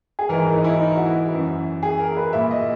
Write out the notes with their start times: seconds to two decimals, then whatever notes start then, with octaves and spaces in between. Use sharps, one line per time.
0.19 G#4
0.29 G#2 E3 A#4
0.47 E4
0.56 D#4
0.64 E4
0.81 D#4
0.96 F#4
1.06 E4
1.31 F#2 E3
1.83 G#4
2.00 A#4
2.17 B4
2.33 A#2 E5
2.51 D#5